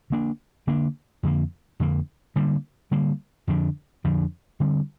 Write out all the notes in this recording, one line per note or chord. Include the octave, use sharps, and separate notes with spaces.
D3 A#3 D4
D3 A#3 D4
F2 D3 A#3
F2 D3 A#3
D3 G3 A#3
D3 G3 A#3
F2 D3 F3 D4
F2 D3 F3 D4
D3 G3 C4